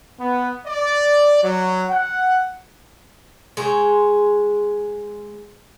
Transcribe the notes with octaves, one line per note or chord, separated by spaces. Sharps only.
B3
D5
F#3
F#5
G#3 G#4 C5 C#5